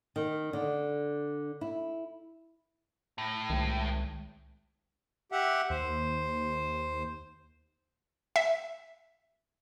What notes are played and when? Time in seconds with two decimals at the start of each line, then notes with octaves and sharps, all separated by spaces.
0.16 D#3
0.53 D3
1.61 E4
3.18 A2
3.50 C2 D#3 G#3
5.32 G4 E5 F#5
5.70 D#2 C5
8.36 E5